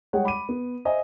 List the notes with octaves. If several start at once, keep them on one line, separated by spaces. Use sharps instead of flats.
G3 G#3 G#4 C#5 F#5 G5
B5 D6 D#7
B3
C5 D#5 E5 G#5